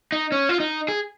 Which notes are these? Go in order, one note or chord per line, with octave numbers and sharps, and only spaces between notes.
D#4
C#4
F4
D#4
G#4